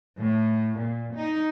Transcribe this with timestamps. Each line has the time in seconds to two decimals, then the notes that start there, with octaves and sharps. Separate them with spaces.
0.18 A2
0.79 A#2
1.14 D#4